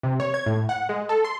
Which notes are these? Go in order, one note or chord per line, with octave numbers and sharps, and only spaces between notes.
C3
C#5
G#6
A2
F#5
G#3
A4
C6